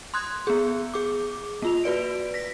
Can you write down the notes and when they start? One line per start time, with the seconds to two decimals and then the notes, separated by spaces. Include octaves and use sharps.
0.14 C6 D#6 F#6 G#6
0.47 B3 G#4
0.94 G#4 D6
1.62 A#3 F4 F7
1.84 F#4 B4 D5 D7
2.34 A#6 B6